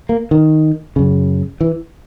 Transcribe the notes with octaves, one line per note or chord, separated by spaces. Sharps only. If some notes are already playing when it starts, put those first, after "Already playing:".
A#3
D#3
F#2 C#3
E3